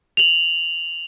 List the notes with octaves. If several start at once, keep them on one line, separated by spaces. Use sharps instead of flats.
F7 F#7